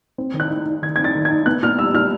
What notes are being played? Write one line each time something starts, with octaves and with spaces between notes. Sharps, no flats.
C4
D#3
F#6
D#4
D#4
D#3 G#6
G#6
C4
A6
D#3
G#6
D#4
B3 F#6
A#2 F6
G3 E6
A#2 F6